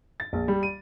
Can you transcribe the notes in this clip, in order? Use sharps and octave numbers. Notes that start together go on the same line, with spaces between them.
A6
A#1
G3
D#7